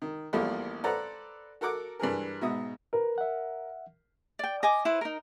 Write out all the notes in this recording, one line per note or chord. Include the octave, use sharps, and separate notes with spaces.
D#3
A#1 E2 F3 G3 A3 A#3
A4 B4 C5 D5 F#5 A#5
F#4 A4 A#4 F#5 D6
G2 E3 G#4 A#4
G#2 B2 E5 D#6
A#4 B4
E5 F#5
D5 G5
D#5 G#5 D6
E4 B4 C5
D#4 A#4